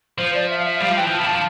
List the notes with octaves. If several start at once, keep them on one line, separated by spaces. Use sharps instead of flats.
F3 C5
D5
E5
F5
E5
G3 F5
F3
E3 G5
F3
A5
E4
D4 A5